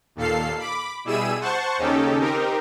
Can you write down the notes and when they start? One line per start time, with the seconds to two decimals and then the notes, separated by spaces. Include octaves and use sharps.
0.16 D#2 A#2 A4 F5 C7
0.59 B5 D6
1.04 B2 G3 E4 G#4 E6 D#7
1.41 C5 F#5 A5 C#6
1.78 D#2 C#3 C#4 D#4 G4 A4
2.20 C4 D#4 G4 A#4